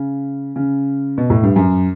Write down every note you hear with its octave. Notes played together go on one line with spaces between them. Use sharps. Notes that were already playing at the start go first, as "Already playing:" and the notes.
Already playing: C#3
C#3
B2
A2
G2
F#2